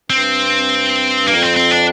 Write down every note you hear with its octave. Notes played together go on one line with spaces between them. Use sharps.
G2 C4
F2 A#3
C4
C4
D4